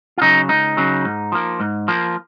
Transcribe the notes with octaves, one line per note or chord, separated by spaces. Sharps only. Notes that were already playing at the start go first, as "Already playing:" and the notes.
F4
C#3 F#3 D#4
C#2 D#4
C#3 F#3
G#2
F3 A#3
G#2
F3 A#3